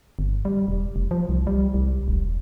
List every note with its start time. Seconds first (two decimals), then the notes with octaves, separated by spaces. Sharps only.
0.19 G1
0.45 G3
0.68 E1
0.96 F1
1.11 F3
1.29 C2
1.47 G3
1.74 C2
2.08 E1